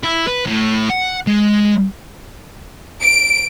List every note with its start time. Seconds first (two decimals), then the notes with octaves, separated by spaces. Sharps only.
0.04 E4
0.28 B4
0.46 A2
0.90 F#5
1.27 G#3
3.02 D7